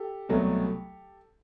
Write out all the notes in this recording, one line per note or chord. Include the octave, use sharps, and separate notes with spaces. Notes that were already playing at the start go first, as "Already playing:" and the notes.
Already playing: G4 A4
C2 B2 F#3 A3